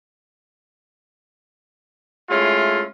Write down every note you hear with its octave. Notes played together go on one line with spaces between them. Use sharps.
G#3 A3 C#4 E4 F4